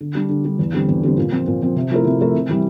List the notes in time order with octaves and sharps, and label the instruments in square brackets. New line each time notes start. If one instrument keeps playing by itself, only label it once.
[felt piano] D3
G3 D4
D3
G3 D4
E2
D3 G3 C4 G4
E2
D3 G3 C4 G4
A#2
F3 C4
A#2
F3 C4
C3
F3 A3 E4 A#4
C3
F3 A3 E4 A#4
C3
E3 G3